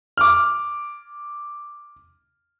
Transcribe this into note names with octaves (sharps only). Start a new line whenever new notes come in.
D6 F6